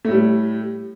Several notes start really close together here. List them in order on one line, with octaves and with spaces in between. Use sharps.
A3 A2 G3